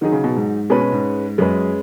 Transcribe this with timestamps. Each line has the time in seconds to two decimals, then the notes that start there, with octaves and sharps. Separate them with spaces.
0.01 D#3 F#3 D#4 G#4
0.12 C#3
0.24 B2
0.36 G#2
0.70 B2 G#3 C#4 B4
0.81 B2
0.92 G#2
1.38 F#2 G#3 C#4 G#4 B4